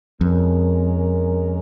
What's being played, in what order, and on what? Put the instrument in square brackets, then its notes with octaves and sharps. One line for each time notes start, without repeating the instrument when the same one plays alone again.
[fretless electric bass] F2 [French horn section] G#3 C#4 A#4